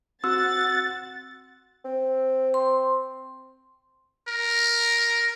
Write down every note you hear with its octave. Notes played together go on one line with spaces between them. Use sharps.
C4 F#4 F#5 C6 E6 A6
C4
C6
A#4